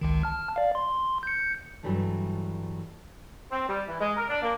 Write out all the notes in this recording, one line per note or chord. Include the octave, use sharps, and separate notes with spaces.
G#1 C#2 D#3
A5 F6
D5 F5
C6
G6 C#7
G2 D3 E3 F#3 G3 A3
C4
G3
E3
G#3
A#4
D4
A#3